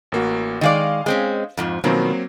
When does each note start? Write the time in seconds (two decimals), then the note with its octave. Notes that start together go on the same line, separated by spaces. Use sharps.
0.12 A1 A#3 F#4
0.61 D#3 G#3 D5 D#5 F5
1.06 G#3 C4 C#4
1.57 F2 G#2 F3
1.84 B2 D#3 F3 F#3 A#3 C4